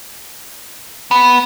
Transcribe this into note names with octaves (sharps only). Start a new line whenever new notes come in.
B3